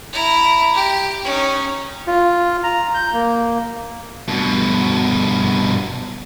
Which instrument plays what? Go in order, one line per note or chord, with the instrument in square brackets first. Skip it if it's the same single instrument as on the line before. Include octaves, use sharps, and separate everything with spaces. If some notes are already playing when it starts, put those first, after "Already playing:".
[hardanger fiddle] E4 A#5
G4
C#4 D#4
[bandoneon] F4
A#5
G6
A#3
[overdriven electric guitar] G2 B2